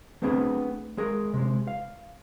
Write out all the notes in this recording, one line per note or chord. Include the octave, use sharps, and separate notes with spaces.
A3 B3 C4 D4 G#4
G#3 G#4 A#4
C3 G#3
F5